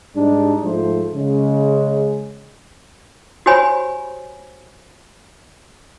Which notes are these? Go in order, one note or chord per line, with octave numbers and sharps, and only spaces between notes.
G#2 G3 D4 D#4
G#2 F3 A3 C5
C#3 G#3
F#4 G4 C5 C#5 G#5 B5